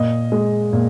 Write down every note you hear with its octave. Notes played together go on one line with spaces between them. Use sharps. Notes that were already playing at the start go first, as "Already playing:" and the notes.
Already playing: A#2 D#5
G#3
A#2